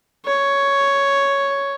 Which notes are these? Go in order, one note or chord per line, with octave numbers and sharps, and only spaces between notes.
C#5